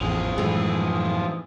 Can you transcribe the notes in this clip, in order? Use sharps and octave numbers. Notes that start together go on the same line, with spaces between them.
A1 F2 E3 F3 G#4
F#2 A2 E3 G#3